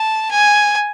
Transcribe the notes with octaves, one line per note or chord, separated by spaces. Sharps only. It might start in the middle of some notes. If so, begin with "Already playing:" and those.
Already playing: A5
G#5